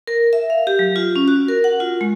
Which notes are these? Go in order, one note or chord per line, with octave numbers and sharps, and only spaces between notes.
A#4
E5
F5
G4
F#3
F4
C#4
F#4
A#4
F#5
F4
G#3